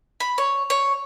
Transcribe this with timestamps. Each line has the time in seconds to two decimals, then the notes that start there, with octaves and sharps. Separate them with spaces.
0.20 B5
0.38 C#5
0.70 C#5